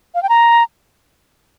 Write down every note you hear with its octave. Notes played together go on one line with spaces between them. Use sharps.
F5
G5
A#5